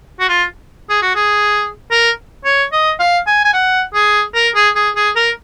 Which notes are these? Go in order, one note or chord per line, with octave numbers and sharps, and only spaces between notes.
F#4
F4
G#4
F#4
G#4
A#4
C#5
D#5
F5
G#5
G#5
F#5
G#4
A#4
G#4
G#4
G#4
A#4